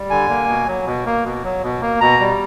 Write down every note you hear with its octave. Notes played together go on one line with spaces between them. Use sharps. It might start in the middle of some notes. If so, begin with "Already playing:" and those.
Already playing: G3
D3 G#5
A#3
B2
F#3
B2
A#3
B2
F#3
B2
A#3
B2 A#5
G3